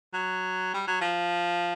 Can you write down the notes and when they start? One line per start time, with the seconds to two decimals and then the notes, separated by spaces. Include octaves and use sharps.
0.13 F#3
0.74 G3
0.87 F#3
1.01 F3